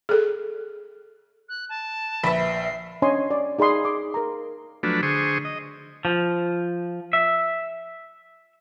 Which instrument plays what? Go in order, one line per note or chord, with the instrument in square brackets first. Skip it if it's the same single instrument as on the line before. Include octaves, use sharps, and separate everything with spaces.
[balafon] G#4 A4
[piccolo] F#6
A5
[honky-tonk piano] A#1 E5 [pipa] B4 B5
[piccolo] C7
[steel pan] C#4 D4 C#5 D#5 G#5 C6
D5
D#4 G#4 D5 B5 C6 D#6
D6
A#4 A#5
[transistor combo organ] F3 F#3 A3 D4 B4
D3 G#4 C5 C#6 D#6
D#5
[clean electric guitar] F3
E5